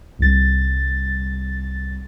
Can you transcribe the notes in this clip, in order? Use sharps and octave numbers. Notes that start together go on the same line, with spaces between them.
C2 A6